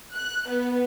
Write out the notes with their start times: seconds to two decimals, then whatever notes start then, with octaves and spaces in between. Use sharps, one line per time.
0.14 F#6
0.48 B3